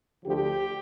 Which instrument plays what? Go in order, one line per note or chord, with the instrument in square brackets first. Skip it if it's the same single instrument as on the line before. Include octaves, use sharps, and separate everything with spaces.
[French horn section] D2 D3 F3 G4